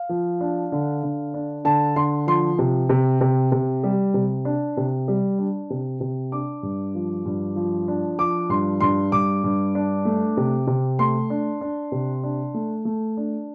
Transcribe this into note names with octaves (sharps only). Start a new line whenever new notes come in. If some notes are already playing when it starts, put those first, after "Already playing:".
Already playing: F5
F3
D4
D3
D3
D4
D3 A5
D3 C6
F3 C6
C3
C3
C3
C3
G3
C3
D4
C3
G3
D4
C3
C3
D4 D6
G2
F3
G2
F3
D4
F3 D6
G2 C6
G2 C6
G2 D6
G2
D4
A3
C3
C3
A3 C6
D4
D4
C3
D4
A3
A3
D4